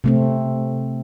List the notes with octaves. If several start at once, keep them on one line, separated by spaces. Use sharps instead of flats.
C3 A3 C4